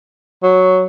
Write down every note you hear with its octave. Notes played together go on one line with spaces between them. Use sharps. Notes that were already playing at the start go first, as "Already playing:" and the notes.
F#3